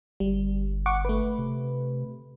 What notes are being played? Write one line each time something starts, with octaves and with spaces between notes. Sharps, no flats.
G1 G3
F#5 C#6 D6
A3 B4
C3